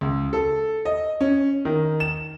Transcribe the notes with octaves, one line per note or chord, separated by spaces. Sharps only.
C#2
A4
D#5
C#4
D#3
E7